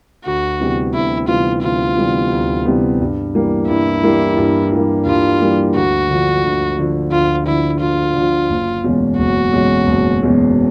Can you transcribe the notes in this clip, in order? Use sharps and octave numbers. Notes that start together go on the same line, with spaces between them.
D2 F#4
C3 E3 G3 B3
D2 E4
C3 E3 G3 B3 F4
D2 F4
C3 E3 G3 B3
D2
C3 E3 G3 B3
G2
E3 G3 A#3
G2 E4
E3 G3 A#3
G2
E3 G3 A#3
G2 F4
E3 G3 A#3
D2 F#4
D3 F3
D2
D3 F3
D2 F4
D3 F3 E4
D2 F4
D3 F3
F#1
E2 B2 G#3 C#4
F#1 F#4
E2 B2 G#3 C#4
F#1
E2 B2 G#3 C#4